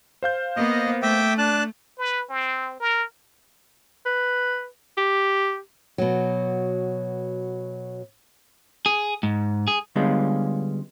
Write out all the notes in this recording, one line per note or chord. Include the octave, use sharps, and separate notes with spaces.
C5 F5 G6
A#3 B3 D#5
A3 E5 G5 D6
D4 A5 F#6
B4
C4
A#4
B4
G4
B2 F#3
G#4
G#2
G#4
D3 G3 G#3 B3 C#4 F4